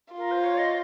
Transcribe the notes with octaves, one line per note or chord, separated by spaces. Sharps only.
F4 A#4
C5
C#5
D#5